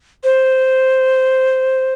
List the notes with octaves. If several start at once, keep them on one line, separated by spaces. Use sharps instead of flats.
C5